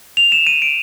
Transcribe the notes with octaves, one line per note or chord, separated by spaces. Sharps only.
F7
E7
D#7
D7